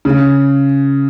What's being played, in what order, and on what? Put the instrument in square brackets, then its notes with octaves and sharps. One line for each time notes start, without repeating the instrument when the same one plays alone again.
[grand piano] C#3